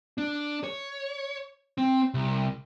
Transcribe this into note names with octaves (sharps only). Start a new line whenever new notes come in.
D4
C#5
C4
C2